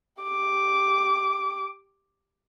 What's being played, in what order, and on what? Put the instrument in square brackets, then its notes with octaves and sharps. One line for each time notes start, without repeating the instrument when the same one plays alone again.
[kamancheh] G4 D6